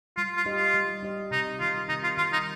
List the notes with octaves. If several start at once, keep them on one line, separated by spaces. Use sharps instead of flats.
G3 F4
F4
D#4 G4 D#5
F4
G3
D#4 G4 D#5
C3 D#4
D#3 G3 F4
C3 D#4
F4
D#3 G3 F4
D#4